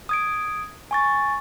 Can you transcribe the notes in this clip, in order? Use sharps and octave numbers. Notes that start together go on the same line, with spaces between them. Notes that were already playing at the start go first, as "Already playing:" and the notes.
D#6 G#6 D7
G#5 C#6 A6